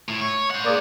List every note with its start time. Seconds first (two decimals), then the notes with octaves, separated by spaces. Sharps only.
0.09 A2
0.21 C#5
0.51 C5 F#5
0.65 A#3 G#4 D5